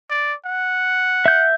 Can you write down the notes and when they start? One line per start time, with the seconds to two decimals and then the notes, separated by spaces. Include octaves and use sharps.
0.10 D5
0.45 F#5
1.26 E5 G6